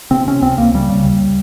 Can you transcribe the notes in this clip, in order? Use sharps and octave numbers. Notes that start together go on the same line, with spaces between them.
C3 C4
C3 C#4
C#2 C4
C#2 A#3
C#3 G3
C#3
D#2